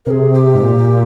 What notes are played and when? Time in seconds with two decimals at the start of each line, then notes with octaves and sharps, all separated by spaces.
0.06 C3 G#4 A#4
0.34 G4
0.55 G#2
0.62 A#2